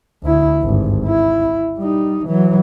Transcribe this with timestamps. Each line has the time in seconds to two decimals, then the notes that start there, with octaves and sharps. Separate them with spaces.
0.23 D2 E4
0.63 G#1 G2
1.05 E4
1.78 G3 D#4
2.26 E3 F#3